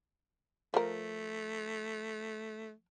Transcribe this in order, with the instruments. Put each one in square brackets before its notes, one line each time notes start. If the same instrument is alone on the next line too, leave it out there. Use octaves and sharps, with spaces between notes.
[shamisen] F3 A#4 [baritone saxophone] A3